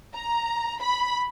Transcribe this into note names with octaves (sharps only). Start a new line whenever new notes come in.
A#5
B5